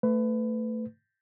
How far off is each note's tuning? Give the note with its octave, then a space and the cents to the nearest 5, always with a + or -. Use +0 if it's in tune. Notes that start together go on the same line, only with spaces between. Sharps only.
A3 +20 B4 +25